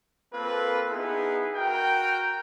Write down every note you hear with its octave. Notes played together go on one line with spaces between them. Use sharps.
A#3 C4 F4 A4 B4
B3 D#4 E4 G#4
F#4 A#4 G5